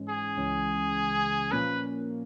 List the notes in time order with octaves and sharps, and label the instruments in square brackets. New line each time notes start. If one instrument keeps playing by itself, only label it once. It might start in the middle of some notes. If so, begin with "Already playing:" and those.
Already playing: [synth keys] G#2 E3 G#3 C#4
[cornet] G#4
[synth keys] C#2 C#3 E3 G#3 C#4
[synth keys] A#2 F3 A#3 C#4 [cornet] B4